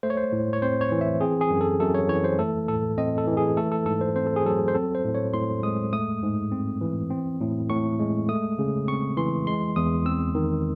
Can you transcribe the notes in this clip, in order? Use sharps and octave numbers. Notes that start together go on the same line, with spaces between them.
A3 C5
C#5
C5
A2
C#5
C4 C5
C#5
E3
E5
C4 G#4
G#4
F#2
A4
F#2 A4
C#5
E3 C#5
C5
A3 A4
A2 A4
C4 D#5
A4
E3
G#4
A3 A4
A4
G#2 A4
C5
C4 C5
A4
G#4
F#3 A4
C5
C4 A4
C5
A2
C#5
A2 C6
G#3 D#6
A3 D#6
G#2
C4
E3
C4
A2
A2 C#6
G#3
A3 D#6
C#3
C4 C#6
E3 C6
G#3 C6
E2 D#6
C4 E6
D#3